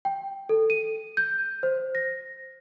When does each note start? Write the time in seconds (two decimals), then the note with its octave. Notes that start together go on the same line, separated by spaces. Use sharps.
0.05 G5
0.49 A4
0.70 D#7
1.17 G6
1.63 C5
1.95 A#6